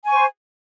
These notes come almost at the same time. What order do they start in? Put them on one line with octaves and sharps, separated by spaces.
G#5 C#6 C5